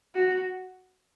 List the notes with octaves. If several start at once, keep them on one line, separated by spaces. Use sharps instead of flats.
F#4